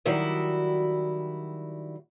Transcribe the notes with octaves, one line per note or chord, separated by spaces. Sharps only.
D#3 F#3 G3 E4 F#4 D#5